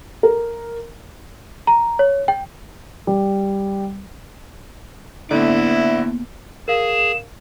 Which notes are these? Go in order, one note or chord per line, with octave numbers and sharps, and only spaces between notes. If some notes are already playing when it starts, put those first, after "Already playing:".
A#4
A#5
C#5
G5
G3
A2 D3 A#3 B3 E4 D5 E5
G#4 A#4 F5 E7